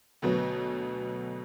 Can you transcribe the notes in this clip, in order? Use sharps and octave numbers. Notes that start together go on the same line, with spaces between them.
D2 B2 F#3 B3